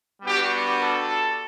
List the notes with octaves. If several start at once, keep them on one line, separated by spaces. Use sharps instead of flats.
G3 B3 D4 F#4 G4
A4